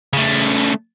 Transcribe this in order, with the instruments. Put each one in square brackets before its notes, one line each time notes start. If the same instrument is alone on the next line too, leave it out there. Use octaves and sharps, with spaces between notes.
[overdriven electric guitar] C#3 A3